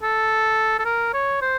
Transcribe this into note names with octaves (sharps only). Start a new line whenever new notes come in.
A4
A4
A#4
C#5
C5